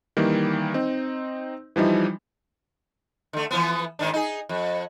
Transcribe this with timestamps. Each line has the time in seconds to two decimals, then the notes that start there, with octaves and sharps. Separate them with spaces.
0.17 D#3 E3 G3 A#3
0.74 C4 D#4
1.76 E3 F3 G3 D#4 E4
3.33 D3 A3
3.51 E3 F3 B3
3.99 G#2 D#3 D4
4.13 D#4 G#4
4.49 F2